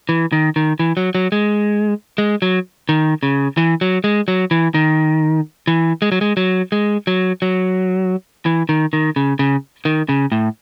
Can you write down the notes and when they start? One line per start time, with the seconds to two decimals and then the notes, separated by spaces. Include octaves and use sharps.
0.09 E3
0.32 D#3
0.56 D#3
0.79 E3
0.97 F#3
1.15 F#3
1.32 G#3
2.18 G#3
2.42 F#3
2.89 D#3
3.23 C#3
3.57 E3
3.81 F#3
4.04 G#3
4.28 F#3
4.51 E3
4.74 D#3
5.67 E3
6.02 G#3
6.12 F#3
6.21 G#3
6.37 F#3
6.72 G#3
7.07 F#3
7.42 F#3
8.46 E3
8.69 D#3
8.93 D#3
9.16 C#3
9.39 C#3
9.85 D#3
10.09 C#3
10.32 A2